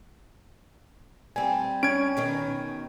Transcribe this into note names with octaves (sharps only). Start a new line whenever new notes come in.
G3 C4 G#5
C#4 G#6 D7
B2 D#3 D#4